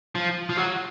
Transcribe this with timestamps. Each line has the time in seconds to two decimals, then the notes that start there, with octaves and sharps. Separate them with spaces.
0.15 F3
0.49 F3
0.57 F#3